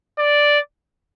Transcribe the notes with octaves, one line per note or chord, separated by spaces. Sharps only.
D5